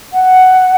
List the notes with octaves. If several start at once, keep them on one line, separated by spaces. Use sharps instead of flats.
F#5